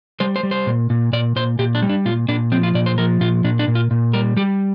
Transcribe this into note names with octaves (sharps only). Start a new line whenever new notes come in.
G3 C5
C5
G3
C5
A#2
A#2
A#2 D5
A#2 C5
A#2 G4
D4
G3
D4
A#2 F4
A#2 D4
F3 C4
F4
A#2 D5
C5
F3 A#4
A#2 F4
A#2 D4
D4
A#2
F4
A#2
G3 A#4
G3 G4